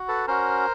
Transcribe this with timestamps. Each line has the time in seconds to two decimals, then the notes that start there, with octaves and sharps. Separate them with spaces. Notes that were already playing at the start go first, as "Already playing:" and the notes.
Already playing: F#4
0.08 A4 B4
0.27 C#4 F#4 A#4 C5